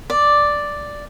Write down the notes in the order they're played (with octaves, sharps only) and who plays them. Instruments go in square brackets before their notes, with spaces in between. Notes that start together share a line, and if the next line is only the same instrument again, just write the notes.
[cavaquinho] D5